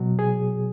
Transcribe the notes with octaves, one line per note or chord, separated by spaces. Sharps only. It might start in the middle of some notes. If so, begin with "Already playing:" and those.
Already playing: B2 F#3
G#4